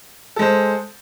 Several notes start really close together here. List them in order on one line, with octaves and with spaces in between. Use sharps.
A4 G#3 C5